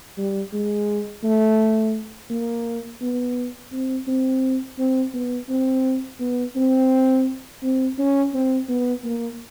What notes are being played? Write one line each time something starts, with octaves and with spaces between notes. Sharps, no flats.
G3
G#3
A3
A#3
B3
C4
C4
C4
B3
C4
B3
C4
C4
C#4
C4
B3
A#3